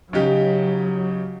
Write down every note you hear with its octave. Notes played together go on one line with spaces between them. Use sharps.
C#3 F#3 D#4 G4